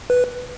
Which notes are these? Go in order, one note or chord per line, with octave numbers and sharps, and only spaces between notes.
B4